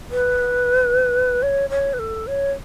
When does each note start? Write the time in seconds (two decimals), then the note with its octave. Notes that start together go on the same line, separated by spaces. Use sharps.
0.11 B4
1.43 C#5
1.70 C#5
1.94 B4
1.99 A4
2.27 C#5